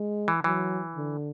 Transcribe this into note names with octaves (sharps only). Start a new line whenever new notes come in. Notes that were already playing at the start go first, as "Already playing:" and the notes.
Already playing: G#3
E3
E3 F#3
D3